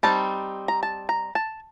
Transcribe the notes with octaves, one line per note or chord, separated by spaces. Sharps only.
G3 C4 D#4 A5
A#5
A5
A#5
A5